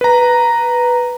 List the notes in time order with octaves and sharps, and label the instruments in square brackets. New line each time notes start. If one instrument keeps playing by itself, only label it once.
[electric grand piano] B4 A#5